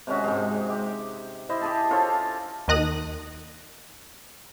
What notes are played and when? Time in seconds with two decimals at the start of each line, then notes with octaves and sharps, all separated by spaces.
0.07 C3 G#3 C#4 F#4
0.24 G#2 C3 G#3
0.70 G4
1.49 E4 C5 D#5
1.61 G4 G#4 A5
1.91 F4 A4 C5 C#5
2.68 D#2 D#3 D#5 F#6 A#6 D#7